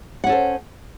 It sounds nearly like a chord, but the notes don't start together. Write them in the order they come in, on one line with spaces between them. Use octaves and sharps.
F#5 C#4 A4 C5